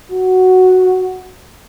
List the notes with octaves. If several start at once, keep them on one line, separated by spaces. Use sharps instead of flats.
F#4